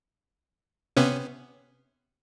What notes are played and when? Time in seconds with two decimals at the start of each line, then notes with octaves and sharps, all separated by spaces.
0.97 C3 B3 C#4